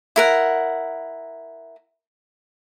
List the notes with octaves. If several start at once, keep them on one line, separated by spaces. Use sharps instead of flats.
E4 A#4 F#5